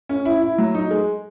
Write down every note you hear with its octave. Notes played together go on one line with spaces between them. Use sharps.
C#4
E4
E4
F#3
D#4
G#3